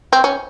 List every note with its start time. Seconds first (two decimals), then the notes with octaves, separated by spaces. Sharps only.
0.13 C4
0.24 C#4